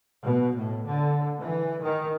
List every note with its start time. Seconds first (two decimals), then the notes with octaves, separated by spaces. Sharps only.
0.24 B2
0.56 A2
0.86 D3
1.38 E3
1.81 D#3